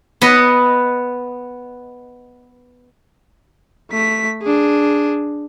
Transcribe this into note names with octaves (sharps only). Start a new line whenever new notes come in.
B3 B4 D#5
A3 B6
D4 G#4